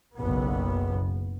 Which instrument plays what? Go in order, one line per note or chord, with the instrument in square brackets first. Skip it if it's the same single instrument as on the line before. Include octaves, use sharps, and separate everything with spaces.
[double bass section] F#1 B1 B3